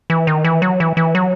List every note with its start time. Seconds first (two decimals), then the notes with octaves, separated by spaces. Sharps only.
0.10 E3
0.27 D#3
0.44 E3
0.62 F#3
0.80 E3
0.97 E3
1.15 F#3